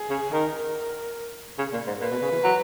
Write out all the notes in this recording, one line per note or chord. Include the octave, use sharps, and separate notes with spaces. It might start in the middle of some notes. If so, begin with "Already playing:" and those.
Already playing: G#4
C#3
D#3 A#4
C#3
A#2
G#2
A#2 B4
B2
C#3
E3
F#3